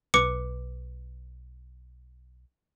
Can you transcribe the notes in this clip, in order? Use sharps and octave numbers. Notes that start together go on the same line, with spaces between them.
B1 B4 D6 C#7